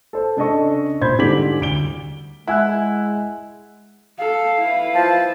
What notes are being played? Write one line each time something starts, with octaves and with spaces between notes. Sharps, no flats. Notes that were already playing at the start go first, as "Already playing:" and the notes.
A4 C5
C#3 D4 A4 D#5 C#6
A#2 C5 B5 C6 G6 G#6
G#2 D3 G3 D6 B6 F#7
D2 D7 G7
G#3 E4 F#5 G#5 F#6
A4 F5
E4 B4
F3 A5